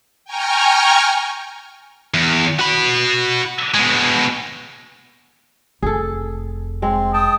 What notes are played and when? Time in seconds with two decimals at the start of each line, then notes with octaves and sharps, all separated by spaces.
0.24 G5 G#5 A#5 C#6 F6
2.14 E2
2.59 F#4 B5
3.74 B2 G#3
5.83 F1 G#4 A4
6.82 G#3 C4
7.14 G5 A5 D#6